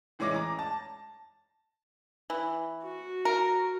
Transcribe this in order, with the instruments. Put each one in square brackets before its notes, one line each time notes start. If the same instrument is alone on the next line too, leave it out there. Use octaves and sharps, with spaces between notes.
[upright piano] A2 E3 G#3 C#4 D6 A#6
A#5 D6
A5
[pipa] E3
[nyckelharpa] F#4
[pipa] A#4